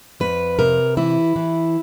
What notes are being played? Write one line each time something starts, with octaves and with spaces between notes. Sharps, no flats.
F2 B4
C3 A#4
E3 E4
E3